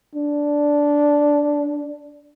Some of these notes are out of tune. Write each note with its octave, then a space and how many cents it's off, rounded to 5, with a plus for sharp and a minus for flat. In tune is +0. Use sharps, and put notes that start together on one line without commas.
D4 -10